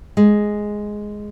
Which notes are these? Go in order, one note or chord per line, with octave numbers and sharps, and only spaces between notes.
G#3